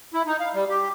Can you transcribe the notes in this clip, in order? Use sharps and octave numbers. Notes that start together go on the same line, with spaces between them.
E4
D#4
F5
G3
G4